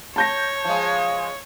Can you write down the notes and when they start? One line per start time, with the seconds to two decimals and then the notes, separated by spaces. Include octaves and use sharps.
0.16 C#5 A5 G6 A#6
0.65 F3 G#3